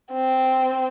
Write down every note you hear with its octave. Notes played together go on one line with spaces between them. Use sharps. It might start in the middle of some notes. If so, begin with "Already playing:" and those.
C4